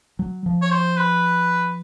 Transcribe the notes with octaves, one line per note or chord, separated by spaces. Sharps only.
F#3
F3
C#5
C5
B4